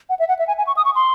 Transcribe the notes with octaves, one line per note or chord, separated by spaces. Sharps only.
F#5
E5
F#5
E5
G#5
G#5
C#6
D#6
C#6
C6